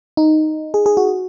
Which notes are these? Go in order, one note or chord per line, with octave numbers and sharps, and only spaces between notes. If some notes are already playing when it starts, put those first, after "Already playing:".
D#4
G#4
G#4
F#4